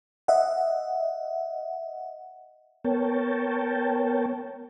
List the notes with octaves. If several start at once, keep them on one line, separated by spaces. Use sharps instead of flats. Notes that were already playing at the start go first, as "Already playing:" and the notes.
D#5 E5 F#5
B3 A#4 C#5 G5 A5